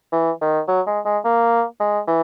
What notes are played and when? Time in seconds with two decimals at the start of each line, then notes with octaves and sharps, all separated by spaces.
0.12 E3
0.41 D#3
0.68 F#3
0.87 G#3
1.05 G#3
1.24 A#3
1.80 G#3
2.07 E3